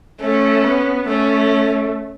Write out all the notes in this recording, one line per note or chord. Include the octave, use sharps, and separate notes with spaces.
A3 C#4
B3
A3 C#4